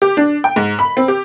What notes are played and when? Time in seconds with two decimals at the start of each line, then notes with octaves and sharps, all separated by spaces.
0.02 G4
0.17 D4
0.44 G5
0.56 G#2
0.79 B5
0.97 C4
1.08 G4